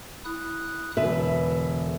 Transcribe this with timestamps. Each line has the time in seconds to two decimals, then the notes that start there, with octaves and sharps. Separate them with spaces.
0.25 E4 D#6 F#6
0.97 E1 D3 B4 E5